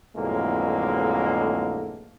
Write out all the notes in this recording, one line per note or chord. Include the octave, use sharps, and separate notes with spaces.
B1 F2 A2 D3 G#3 A#3